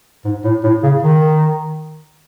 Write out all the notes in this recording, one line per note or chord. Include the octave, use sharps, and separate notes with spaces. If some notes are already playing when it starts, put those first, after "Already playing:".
G#2
A2
A2
C#3
D#3